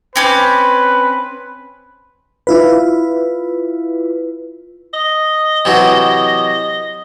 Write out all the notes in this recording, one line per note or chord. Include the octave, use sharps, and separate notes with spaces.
C4 C#4 B4 D6
E4 F4 B4
D#5
C3 E3 F#3